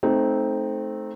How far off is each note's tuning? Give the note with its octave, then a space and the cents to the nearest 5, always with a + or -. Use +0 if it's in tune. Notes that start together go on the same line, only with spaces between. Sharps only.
A3 -20 C4 +0 D#4 +0